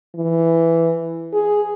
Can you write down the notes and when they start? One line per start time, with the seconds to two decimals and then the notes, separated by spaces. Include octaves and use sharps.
0.15 E3
1.33 G#4